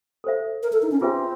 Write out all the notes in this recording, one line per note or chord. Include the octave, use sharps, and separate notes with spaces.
A4 C5 E5
A#4
A4
D#4
C#4
C4 F4 G#4 B4 E5 G#5